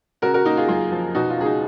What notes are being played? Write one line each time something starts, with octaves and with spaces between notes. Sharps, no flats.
C#3 F#4 A#4
F#4 A#4
A#3 D#4 F#4
F4 G#4
F#2 F4 G#4
F3
B2 D#4 F#4
F4
C#2 G#4
D#4 F#4